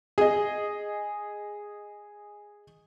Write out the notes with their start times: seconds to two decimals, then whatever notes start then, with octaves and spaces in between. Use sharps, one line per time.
0.18 G#4 D#5